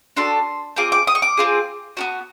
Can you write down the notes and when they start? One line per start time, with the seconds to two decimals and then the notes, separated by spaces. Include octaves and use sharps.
0.17 D4 F#4 A4 C6
0.76 C4 F4 G#4 D6
0.92 D6
1.07 D#6
1.15 C#6
1.22 D6
1.37 C4 F4 G#4
1.97 B3 D4 F#4